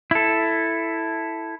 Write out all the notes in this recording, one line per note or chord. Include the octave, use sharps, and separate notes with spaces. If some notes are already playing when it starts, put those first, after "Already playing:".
E4 A4